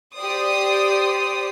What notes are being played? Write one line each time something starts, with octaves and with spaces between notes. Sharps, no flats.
G4 C5 D5 D#6